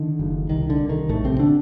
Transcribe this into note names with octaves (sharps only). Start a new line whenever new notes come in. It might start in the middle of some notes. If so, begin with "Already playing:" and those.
Already playing: D3 D#3
F#1
C2 D#3
D3
C2
D#3
A#1 A2 A3
C3 C4
D3 D4